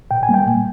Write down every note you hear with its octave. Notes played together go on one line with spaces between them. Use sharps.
A#2 G5
G#5
G3 A#3
G5
A#2